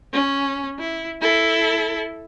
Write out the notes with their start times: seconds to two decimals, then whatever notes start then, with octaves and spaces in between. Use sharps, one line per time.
0.13 C#4
0.79 E4
1.21 E4 A4